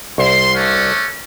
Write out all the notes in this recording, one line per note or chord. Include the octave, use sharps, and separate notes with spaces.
C2 A#4 E5 C6
A3 C#4 D4